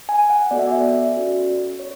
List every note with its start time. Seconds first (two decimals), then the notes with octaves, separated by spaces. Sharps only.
0.09 G#5
0.30 F#5
0.51 B3 F#4 A4 D5
0.59 E5
0.67 D5
1.16 C#4 F#4 A4
1.79 C#5